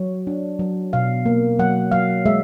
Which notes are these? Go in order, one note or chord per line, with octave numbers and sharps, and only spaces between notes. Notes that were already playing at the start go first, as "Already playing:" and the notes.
Already playing: F#3 C#5
D4
F#3
B2 F5
A#3
F#3 F#5
F#3 F5
G#3 E5